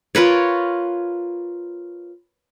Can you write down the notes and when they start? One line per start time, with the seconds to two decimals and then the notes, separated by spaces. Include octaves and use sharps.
0.15 F4 A#4 B4 C#5